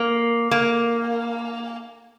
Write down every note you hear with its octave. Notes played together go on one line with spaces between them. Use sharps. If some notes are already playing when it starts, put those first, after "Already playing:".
Already playing: A#3
A#3